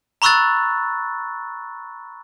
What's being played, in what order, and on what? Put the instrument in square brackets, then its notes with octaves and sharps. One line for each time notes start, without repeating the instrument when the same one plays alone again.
[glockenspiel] A#5 B5 C#6 E6 F#6 A6